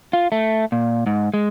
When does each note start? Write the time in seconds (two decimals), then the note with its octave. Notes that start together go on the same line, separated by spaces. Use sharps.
0.13 F4
0.32 A3
0.72 A#2
1.06 G#2
1.34 G#3